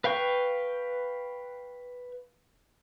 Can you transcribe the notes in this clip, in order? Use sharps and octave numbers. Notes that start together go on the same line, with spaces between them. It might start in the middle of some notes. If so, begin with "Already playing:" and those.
B4 F5 G5 C#6